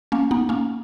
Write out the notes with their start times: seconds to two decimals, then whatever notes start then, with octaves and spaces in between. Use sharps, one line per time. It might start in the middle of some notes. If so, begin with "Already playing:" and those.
0.12 A#3 C#4
0.31 B3 D#4
0.49 A#3 C#4